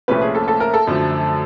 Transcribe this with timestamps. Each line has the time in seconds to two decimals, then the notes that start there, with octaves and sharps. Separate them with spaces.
0.08 C2 A#2 F3 A3 C#4 B4
0.21 G#4
0.35 A4
0.48 A4
0.60 A#4
0.74 A4
0.87 F#2 D3 F3 A3